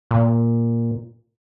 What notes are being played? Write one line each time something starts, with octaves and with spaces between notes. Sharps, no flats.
A#2